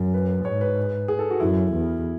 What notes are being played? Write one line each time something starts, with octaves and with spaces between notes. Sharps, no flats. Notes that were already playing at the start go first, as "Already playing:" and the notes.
Already playing: F#2
B4
G#2 C#5
B4
G#4
A4
F#4
F#2 E4
E2